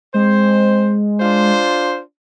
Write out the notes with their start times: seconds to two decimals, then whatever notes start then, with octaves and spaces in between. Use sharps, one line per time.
0.14 G#3 C4 C5
1.20 D4 F4 C5